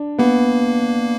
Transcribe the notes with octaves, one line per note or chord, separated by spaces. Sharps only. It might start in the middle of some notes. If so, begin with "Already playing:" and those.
Already playing: D4
A#3 B3